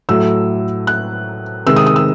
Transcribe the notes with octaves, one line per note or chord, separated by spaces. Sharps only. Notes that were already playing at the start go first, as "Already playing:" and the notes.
A2 F#3 A3 E6
F#6
C3 D#3 G#3 E6
D#6
D#6
E6